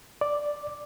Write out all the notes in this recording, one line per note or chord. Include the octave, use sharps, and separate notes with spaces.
D5